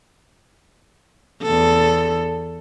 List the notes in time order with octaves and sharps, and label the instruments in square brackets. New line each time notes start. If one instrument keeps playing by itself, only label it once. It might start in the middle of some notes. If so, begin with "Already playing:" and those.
[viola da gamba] E2 A4